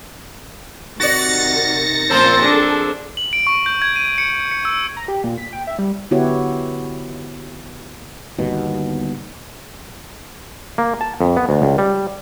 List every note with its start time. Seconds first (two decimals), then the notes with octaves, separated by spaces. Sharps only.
1.00 C3 D#3 F#4 D5 A6 A#6 C#7
2.10 A#2 F3 C4 C#4 A#4 C5 A5
2.42 D4 G#4 A4
3.17 F#7
3.33 D7
3.47 C#6
3.66 G6
3.82 G#6
3.96 D#7
4.18 C#7
4.51 C#7
4.65 E6
4.97 A#5
5.08 G4
5.24 A#2
5.38 B6
5.53 G5
5.67 E5
5.78 G3
6.11 D3 B3 E4 F#4 G4 C#5
8.38 G1 D#2 B2
10.78 A#3
11.01 A5
11.21 F2
11.37 B3
11.49 D2
11.62 C#2
11.78 G3